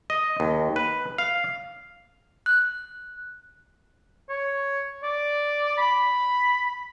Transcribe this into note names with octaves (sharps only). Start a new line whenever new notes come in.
D#5
D#2
B4
F5
F#6
C#5
D5
B5